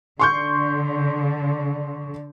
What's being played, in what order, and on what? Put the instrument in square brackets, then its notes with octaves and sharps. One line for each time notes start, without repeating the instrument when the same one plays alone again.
[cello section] D3 [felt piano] C6 C#6 G6